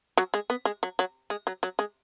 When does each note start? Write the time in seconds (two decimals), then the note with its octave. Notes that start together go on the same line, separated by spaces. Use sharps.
0.18 F#3
0.34 G#3
0.50 B3
0.65 G#3
0.83 F#3
0.99 F#3
1.30 G#3
1.47 F#3
1.63 F#3
1.79 G#3